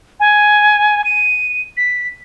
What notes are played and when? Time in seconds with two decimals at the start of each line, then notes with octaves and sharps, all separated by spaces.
0.20 G#5
1.04 D#7
1.77 B6